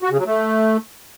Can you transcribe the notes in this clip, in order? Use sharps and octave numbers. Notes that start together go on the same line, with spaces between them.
F#4
C#3
F#3
A3